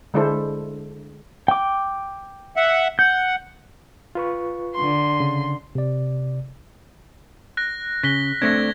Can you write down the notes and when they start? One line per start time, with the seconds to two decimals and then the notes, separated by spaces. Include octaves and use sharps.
0.14 D3 G#3 D4 E4 A4 C5
1.48 G5 D6
2.57 E5 F#5
2.99 F#5 G6
4.15 F4 B4 C#6
4.74 D3 C6
5.20 C#3
5.75 C3 D5
7.57 F#6 A#6
8.03 C#3 A#6 B6 G7
8.42 A3 C4 D4 G#6 A#6